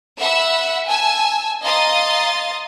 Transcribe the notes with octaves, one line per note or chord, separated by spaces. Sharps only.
E5 F#5 B5 E6
G#5 A5 E6
D#5 F5 A#5 C6 D#6 A6